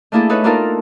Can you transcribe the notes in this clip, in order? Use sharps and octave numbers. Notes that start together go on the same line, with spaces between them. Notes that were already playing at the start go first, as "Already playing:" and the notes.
A3 A#3 D4 E4 G#4 A4
D#4 A4 B4 C#5
A#3 D4 D#4 F4 A4 A#4